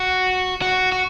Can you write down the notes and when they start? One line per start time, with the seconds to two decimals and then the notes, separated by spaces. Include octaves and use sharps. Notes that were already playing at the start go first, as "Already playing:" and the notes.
Already playing: F#4
0.62 F#4
0.92 F#4